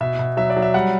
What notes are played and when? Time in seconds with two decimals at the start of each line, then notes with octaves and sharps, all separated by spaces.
0.01 B2 E5
0.19 B2
0.37 F#3 E5
0.50 D5
0.56 F#3
0.62 E5
0.74 G3 F#5